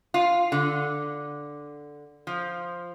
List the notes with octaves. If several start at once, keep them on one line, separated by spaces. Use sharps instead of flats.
F4
D3
F3